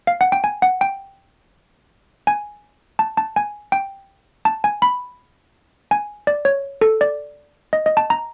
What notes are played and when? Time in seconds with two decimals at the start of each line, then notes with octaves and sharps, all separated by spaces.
0.07 F5
0.21 F#5
0.32 G5
0.44 G#5
0.62 F#5
0.81 G5
2.27 G#5
2.99 A5
3.17 A5
3.36 G#5
3.72 G5
4.45 A5
4.64 G#5
4.82 B5
5.91 G#5
6.27 D5
6.45 C#5
6.81 A4
7.01 D5
7.73 D#5
7.86 D#5
7.97 A5
8.10 A#5